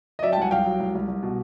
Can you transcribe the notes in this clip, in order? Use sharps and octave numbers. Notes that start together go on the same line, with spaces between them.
D#5
F#3 D5 E5
G5 A5
C2 F#5 G#5
C2 F5 G5
F#3
C2
C2
C2
B2